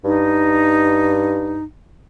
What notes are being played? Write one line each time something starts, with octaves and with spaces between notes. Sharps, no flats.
G2 D#4